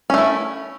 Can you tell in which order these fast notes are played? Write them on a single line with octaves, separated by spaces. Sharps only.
C#4 A3 E4